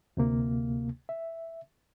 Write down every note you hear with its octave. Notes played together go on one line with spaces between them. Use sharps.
D2 C3 A#3
E5